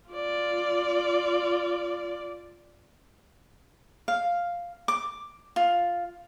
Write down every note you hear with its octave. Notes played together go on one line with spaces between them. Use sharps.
F4 D5
F5
D6
F4